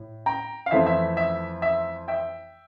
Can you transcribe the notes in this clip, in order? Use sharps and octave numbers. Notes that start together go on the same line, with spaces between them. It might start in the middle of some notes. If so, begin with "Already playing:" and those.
Already playing: A2
G5 A#5
F5
F2 E3 A3 C4 E5
E5
E5
E5
E5 G5